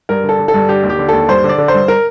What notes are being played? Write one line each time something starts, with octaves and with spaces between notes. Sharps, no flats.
G2 A#4
D3
A4
D3
A4
G2
D3 G4
D#2
G4
D3
D#2 A4
G2 C5
D3
D5
D3
C5
G2
A#4